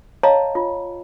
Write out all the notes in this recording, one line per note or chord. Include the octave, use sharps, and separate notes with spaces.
C#5 D#5 F5 A5 A#5
F4